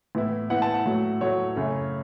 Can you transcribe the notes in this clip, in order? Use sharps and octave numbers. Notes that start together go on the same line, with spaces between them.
A2 E3 B3 E4
A2 E3 B3 E4 F#5
A5
F#5
A2 F#3 A3
A2 F#3 A3 C#5
F#2 C#3 A3 C#4